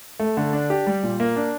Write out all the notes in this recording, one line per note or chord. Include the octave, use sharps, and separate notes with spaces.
A3
D3
D4
G4
G3
A#2
A#3
D4